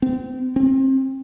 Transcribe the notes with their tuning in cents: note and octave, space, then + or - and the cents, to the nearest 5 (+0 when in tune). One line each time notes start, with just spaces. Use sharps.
C4 -30
C4 +30